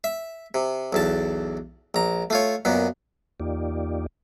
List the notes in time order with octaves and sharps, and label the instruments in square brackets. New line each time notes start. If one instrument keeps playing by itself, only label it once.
[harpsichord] E5
C3
B1 E2 A5
A#1 A#5
A3 F4 C#5
F#2 A#2 B3
[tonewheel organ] E2 A#3 D#4 F4 G4 D5